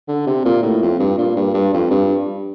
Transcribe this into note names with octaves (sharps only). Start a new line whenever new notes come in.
D3
C3
A#2
A2
F2
G2
A#2
G2
G2
F2
G2